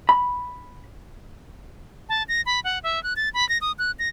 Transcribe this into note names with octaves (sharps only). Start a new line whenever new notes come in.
B5
A5
A#6
B5
F#5
E5
F#6
A6
B5
A#6
D#6
F#6
A#6